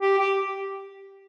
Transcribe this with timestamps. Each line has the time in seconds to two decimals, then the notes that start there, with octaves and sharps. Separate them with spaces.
0.02 G4
0.19 G4